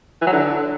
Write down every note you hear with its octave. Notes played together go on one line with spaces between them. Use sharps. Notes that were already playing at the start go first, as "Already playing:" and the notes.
E3
F#3
D3